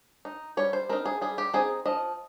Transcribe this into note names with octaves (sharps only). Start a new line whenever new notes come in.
D#4
G3 C#5
C5
C4 D#4 A#4
G#4
G3 G#4
G4
C4 D#4 G#4
F3 D#5